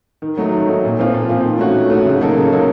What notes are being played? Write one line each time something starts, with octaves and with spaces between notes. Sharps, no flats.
D#3
F#3 A3 D#4
D#3
F#3 A3 D#4
A#2
F3 C4 F4
A#2
F3 C4 F4
D#3
A3 C#4 F#4
D#3
A3 C#4 F#4
C#3
F#3 A#3 D#4 A4
C#3
F#3 A#3 D#4 A4